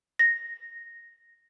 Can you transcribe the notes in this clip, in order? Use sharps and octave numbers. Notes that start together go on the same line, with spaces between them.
A#6